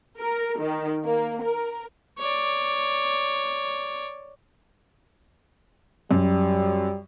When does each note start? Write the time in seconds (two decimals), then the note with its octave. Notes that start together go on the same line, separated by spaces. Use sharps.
0.18 A#4
0.59 D#3
1.04 A#3
1.42 A#4
2.19 C#5 D5
6.11 F#2 G3